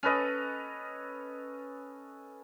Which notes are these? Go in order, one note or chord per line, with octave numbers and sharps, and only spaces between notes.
C#4 A4 B4 D#5